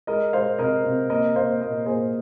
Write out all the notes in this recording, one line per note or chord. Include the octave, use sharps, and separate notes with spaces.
G#3 A#4 D#5
G#3 C5 F5
C3 A#4 D#5
C3
A#3 A#4 D#5
A#3 C5 F5
A#2 A#4 D#5
A#2 G#4 C5